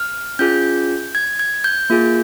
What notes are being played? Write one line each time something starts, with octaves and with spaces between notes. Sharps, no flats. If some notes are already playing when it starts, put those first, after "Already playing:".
Already playing: F6
C#4 F4 G#4 G6
G#6
G#6
G6
A#3 F4 G#4